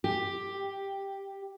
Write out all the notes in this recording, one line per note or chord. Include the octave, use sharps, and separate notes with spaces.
G4